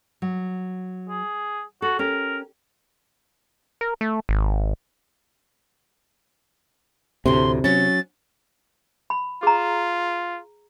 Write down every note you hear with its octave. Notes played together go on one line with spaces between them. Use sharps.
F#3
G#4
F#4 A4
C#4 G4 A#4
A#4
A3
G#1
D2 A2 C3 C6
F#3 C#4 A6
B5
F4 G#4 A#5